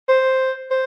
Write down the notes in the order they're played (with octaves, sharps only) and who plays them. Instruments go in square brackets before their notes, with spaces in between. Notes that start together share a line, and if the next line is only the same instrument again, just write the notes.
[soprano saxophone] C5
C5